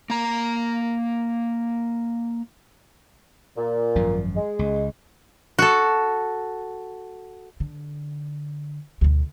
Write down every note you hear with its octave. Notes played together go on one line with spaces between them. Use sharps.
A#3 A#5
A#2
G#1 F#2 F3
G#3
C#2
F#4 A4
D3
D2 B2